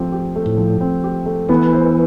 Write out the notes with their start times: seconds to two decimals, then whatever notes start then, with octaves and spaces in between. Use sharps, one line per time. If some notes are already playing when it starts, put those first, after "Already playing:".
Already playing: F3 A3 C4 G4
0.12 G4
0.36 A3
0.46 A2
0.58 F3
0.81 C4
1.04 G4
1.26 A3
1.49 E3 B3
1.73 C5